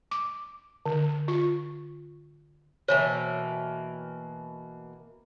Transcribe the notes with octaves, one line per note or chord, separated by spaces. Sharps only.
D6
D3
F4
B2 E3 A#3 C5 C#5